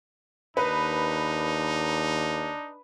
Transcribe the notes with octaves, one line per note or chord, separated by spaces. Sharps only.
D#2 D4 D#4 B4